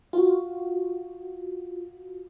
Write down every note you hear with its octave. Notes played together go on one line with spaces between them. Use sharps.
F4 F#4